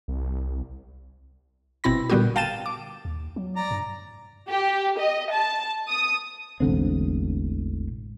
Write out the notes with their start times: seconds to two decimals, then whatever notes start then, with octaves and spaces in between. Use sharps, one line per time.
0.08 C2
1.84 G1 B2 C4 E4 B5 A#6
2.10 A#2 D3 G3 B3 F#4 G4
2.36 F5 G5 A5 A6 D#7 E7
2.66 D6
3.05 D#2
3.36 F#3
3.56 D5 A#5
3.71 G2
4.48 G4
4.99 D#5
5.31 A5
5.89 D#6
6.60 E1 A1 D3 C4